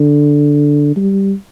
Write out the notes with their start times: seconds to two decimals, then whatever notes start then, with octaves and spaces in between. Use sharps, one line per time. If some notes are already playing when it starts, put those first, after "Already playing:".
Already playing: D3
0.96 G3